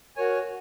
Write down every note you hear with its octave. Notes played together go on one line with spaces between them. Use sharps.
F#4 A#4 C#5 G#5